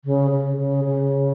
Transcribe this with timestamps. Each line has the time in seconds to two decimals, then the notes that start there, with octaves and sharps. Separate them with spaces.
0.05 C#3
0.31 C#3
0.57 C#3
0.84 C#3